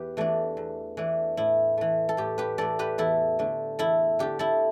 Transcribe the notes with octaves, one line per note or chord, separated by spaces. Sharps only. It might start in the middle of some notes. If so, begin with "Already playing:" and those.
Already playing: E2 G4 B4
E3 A3 D4
E2
E3 A3 D4
A2 E4
E3 A3
A4
A2 G4
G4 B4
E3 A3 A4 D5
G4 B4
E2 E4 A4
D3 A3
E2 E4 A4
D3 A3 G4
E4 A4